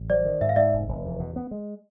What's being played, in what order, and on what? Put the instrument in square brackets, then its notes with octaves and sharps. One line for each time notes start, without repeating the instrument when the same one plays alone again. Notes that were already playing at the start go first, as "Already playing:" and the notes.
Already playing: [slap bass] A1
[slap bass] F#3 [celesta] C5 D5
[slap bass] D#3
[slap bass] G#2 [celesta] E5
[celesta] F5
[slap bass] G#2 [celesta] D5 E5
[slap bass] F1
F1
E2
B2
B3
G#3